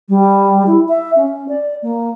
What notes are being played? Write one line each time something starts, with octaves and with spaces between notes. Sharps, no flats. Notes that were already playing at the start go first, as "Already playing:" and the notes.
G3
E4
E5
C#4
D5
A#3